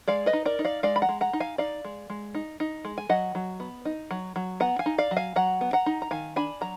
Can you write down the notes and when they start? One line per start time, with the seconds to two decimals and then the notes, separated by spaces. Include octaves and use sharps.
0.08 G#3 D5 F5
0.26 B4 D#5
0.33 D#4
0.45 A#4 D5
0.59 D#4
0.65 D5 F5
0.83 G#3 D5 F5
0.96 B5
1.02 F#5 A#5
1.09 G#3
1.21 F#5 A#5
1.33 D#4
1.40 F5 G#5
1.58 D#4 D5 F5
1.85 G#3
2.10 G#3
2.35 D#4
2.60 D#4
2.85 G#3
2.98 G#5
3.09 F#3 D#5 F#5
3.35 F#3
3.60 B3
3.85 D#4
4.11 F#3
4.36 F#3
4.60 B3 F#5 A#5
4.79 F5 G#5
4.86 D#4
4.98 D5 F5
5.11 F#3
5.17 F5 G#5
5.36 F#3 F#5 A#5
5.61 B3
5.73 F#5 A#5
5.86 D#4
6.02 A#5
6.11 D#3 F5 G#5
6.36 D4 G#5 B5
6.61 F#3 A#5